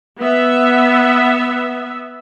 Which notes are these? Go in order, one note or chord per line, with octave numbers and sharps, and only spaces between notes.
B3 E5